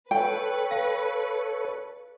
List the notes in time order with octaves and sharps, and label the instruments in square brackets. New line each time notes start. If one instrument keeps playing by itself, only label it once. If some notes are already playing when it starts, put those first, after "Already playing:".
[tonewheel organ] A4 C#5 [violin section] B4 [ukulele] G5
[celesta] F5